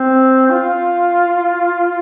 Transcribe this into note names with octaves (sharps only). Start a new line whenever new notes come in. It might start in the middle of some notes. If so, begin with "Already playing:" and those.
Already playing: C4
F4